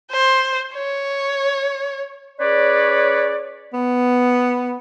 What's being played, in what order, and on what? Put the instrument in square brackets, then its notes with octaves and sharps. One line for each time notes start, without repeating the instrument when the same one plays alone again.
[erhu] C5
C#5
[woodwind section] C#4 G#4 B4 C#5 D5
[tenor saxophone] B3